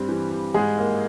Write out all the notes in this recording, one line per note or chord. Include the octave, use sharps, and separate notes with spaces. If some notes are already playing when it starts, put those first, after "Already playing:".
Already playing: G2 G3 C4 G4
E3
G3
G#2 G#3 G#4
A#3